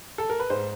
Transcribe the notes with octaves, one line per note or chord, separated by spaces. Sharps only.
A4
A#4
B4
G#2 C5